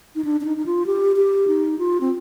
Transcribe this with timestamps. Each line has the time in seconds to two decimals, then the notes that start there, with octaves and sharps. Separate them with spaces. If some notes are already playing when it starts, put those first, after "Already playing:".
0.16 D#4
0.24 D4
0.41 D4
0.45 D#4
0.57 D#4
0.66 F4
0.86 G4
1.16 G4
1.47 D#4
1.79 F4
2.01 C4